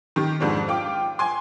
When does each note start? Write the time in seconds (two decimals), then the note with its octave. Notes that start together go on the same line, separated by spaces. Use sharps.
0.16 D#3 G4
0.40 F2 G#2 F3 D4
0.68 F4 G5 D6
1.19 G#5 C6